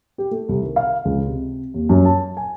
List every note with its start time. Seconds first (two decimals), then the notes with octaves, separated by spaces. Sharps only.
0.18 G4
0.31 A3
0.49 C2
0.63 D#3
0.76 F5
1.05 C#2
1.27 C3
1.74 D#2
1.89 F#2
2.05 A5
2.37 G#5